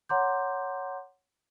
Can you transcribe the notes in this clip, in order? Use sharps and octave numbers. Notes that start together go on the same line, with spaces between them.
C#5 F#5 A#5 C6 D6 G6